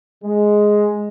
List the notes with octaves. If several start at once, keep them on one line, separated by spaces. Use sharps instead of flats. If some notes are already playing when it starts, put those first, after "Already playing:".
G#3